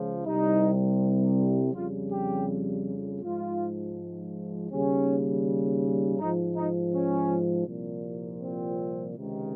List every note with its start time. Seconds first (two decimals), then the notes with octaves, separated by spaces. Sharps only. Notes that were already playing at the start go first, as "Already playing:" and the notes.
Already playing: C#2 C#3 F3
0.26 C2 C3 G3 D#4
1.73 F2 C#3 G3 F4
2.11 G4
3.22 G#2 F3 F4
4.71 D#2 C#3 G3 C#4
6.18 G#2 F3 D#4
6.56 D#4
6.93 C#4
7.67 C2 A#2 F3
8.41 C4
9.16 C#2 C3 D#3